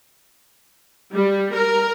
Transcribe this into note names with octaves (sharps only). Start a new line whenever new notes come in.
G3
A#4